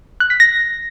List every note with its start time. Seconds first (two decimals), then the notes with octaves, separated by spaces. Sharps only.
0.20 F#6
0.30 B6
0.40 A#6